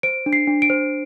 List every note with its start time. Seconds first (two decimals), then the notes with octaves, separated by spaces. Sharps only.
0.03 C5 D7
0.26 D4
0.33 C7
0.47 D4
0.62 D7
0.70 C5